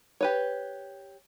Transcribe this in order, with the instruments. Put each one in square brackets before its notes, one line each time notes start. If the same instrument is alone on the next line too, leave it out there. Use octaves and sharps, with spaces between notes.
[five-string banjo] G4 B4 C#5